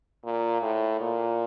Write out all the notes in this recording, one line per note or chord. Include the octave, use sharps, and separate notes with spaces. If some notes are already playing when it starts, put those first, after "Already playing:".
A#2
A2
A#2